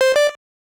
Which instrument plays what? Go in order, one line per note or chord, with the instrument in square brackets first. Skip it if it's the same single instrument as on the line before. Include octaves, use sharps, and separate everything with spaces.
[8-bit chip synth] C5
D5